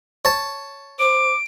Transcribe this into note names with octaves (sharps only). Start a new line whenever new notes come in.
C#5 A5
C5 D6 D7